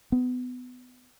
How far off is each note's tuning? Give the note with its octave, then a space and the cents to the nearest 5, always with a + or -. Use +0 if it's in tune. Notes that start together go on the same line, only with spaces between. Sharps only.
B3 +25